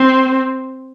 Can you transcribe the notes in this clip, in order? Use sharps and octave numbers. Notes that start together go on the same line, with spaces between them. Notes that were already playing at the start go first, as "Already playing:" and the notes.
Already playing: C4